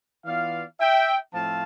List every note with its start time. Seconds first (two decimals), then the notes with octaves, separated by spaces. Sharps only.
0.25 E3 B3 F4 D5 F5
0.79 E5 G5
1.33 A2 F3 A3 C4 F5 A5